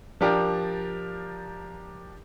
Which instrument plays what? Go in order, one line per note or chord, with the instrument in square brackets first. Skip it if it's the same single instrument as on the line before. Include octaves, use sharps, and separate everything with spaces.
[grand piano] F3 D4 G4 A#4